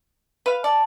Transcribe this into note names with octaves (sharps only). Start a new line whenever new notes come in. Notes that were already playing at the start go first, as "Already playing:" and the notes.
B4 F5
D5 A5